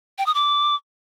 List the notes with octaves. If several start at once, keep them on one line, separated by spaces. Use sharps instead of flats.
G5
D#6
D6